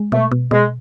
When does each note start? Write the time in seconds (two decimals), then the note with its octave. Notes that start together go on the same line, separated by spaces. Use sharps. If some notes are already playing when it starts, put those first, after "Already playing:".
Already playing: G#3
0.12 B2 A3
0.32 B2
0.51 B2 G#3